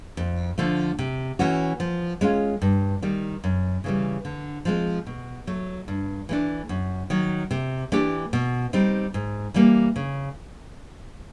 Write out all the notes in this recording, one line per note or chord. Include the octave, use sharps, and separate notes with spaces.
F2
D3 F3 A3
C3
E3 A3 C#4 F#4
F3
G#3 C#4 F4
G2
D#3 G3
F#2
C#3 E3 G3
D3
F3 G#3 C4
B2
F#3 A3
G2
E3 A3 D4
F#2
D#3 F#3
C3
E3 A3 D4 G4
B2
G3 C4 D#4
G#2
E3 G3 A#3
C#3